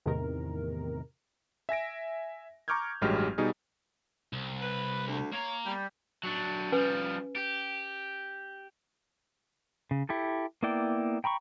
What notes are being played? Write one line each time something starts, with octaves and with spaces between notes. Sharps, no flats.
E2 A2 C3 D#3 A#4
E5 G#5 A#6 D7
A#5 C#6 D6 F6 G6 G#6
A1 G2 F#3 G#3 G4 F6
B2 G3 D#4 G#4
C2
B4
D2
A#3 C#5 A#5
G3
F#3 D4
F3 G3 C#4 B4 G#5
G4
C#3
E4 G4 A4
A#3 B3 E4 D5 G5
G5 A#5 B5 C#6